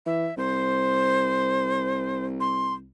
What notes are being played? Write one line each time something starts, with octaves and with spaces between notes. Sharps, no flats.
E3 E5
C2 C5
C6